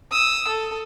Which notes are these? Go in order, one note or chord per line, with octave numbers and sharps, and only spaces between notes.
D#6 E6
A4